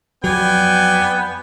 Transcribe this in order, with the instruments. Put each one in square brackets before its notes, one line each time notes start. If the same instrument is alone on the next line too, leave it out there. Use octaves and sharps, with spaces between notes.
[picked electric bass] F2 F#3 [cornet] B3 [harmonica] D5 G5 G#5